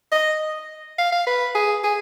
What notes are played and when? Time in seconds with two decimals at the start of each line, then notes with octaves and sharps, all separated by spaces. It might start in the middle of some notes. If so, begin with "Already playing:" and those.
0.12 D#5
0.98 F5
1.12 F5
1.27 B4
1.55 G#4
1.84 G#4